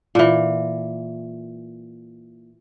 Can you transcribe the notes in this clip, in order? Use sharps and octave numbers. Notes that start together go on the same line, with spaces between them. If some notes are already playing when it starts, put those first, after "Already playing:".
A#2 E3